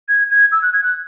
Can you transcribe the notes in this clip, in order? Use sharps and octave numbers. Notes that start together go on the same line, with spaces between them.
G#6
G#6
E6
F#6
G#6
F#6